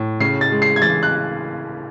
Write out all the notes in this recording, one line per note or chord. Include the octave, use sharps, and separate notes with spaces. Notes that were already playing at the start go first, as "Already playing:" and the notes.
Already playing: A2
C#3 C7
A6
G#3
C7
G#6
E3 A6
F#6